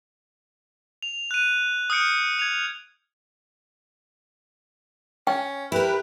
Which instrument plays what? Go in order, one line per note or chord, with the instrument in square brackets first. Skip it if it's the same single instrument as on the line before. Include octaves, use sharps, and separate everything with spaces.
[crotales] F7
F#6 D#7
D#6 F6 G6 C#7 D7
G#6 F7
[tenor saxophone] C#4 [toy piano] G5
[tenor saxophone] E4 [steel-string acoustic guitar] G4 A#4 [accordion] B4